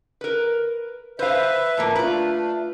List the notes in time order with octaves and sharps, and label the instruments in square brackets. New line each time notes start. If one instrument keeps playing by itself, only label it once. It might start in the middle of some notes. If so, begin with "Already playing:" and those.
[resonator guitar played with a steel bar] A#4 B4
[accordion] B4 E5 [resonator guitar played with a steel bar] C5 F5
[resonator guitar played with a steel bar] A2 F3 A#3
[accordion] A3 D4 [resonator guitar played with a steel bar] F4 B4